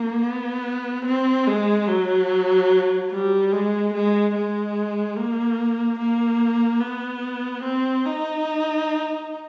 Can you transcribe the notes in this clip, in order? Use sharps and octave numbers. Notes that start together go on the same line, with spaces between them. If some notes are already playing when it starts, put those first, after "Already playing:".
Already playing: A#3
B3
C4
G#3
F#3
G3
G#3
G#3
G#3
A#3
A#3
B3
C4
D#4